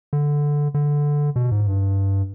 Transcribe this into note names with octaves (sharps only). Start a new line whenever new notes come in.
D3
D3
B2
G#2
G2